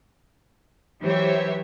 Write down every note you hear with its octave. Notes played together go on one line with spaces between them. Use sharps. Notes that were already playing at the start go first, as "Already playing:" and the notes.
E3 F#3 G4 C5 C#5 E5